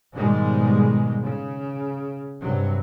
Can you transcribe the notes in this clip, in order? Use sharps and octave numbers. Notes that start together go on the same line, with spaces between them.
G#2 B2 D#3 G3 G#3
C#3
G2 C3 F#3